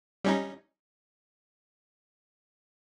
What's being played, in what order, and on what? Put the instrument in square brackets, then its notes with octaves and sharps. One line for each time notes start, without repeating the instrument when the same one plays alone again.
[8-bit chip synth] G3 C#4 D#4